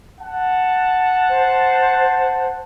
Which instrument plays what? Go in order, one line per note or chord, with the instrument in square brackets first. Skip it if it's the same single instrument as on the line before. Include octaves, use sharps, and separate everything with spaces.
[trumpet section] F#5 A5
[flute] C5